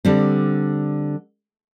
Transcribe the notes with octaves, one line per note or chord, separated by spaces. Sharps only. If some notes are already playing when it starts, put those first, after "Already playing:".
D3 G3 C4